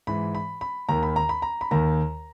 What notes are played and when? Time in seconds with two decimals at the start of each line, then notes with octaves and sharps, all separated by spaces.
0.07 G#2 E3 B5
0.35 B5
0.61 B5
0.89 D#2 D#3 A#5
1.03 B5
1.16 A#5
1.29 B5
1.42 A#5
1.61 B5
1.71 D#2 D#3 A#5